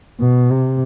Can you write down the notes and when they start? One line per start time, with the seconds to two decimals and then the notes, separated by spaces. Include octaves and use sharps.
0.20 B2
0.50 C3